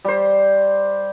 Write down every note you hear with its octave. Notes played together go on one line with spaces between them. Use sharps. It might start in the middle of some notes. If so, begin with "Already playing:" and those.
G3 C5